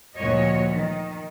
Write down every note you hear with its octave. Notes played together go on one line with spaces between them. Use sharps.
D2 A#2 F3 F#4 C#5 D#5
D#3